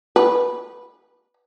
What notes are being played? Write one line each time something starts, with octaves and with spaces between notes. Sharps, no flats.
B4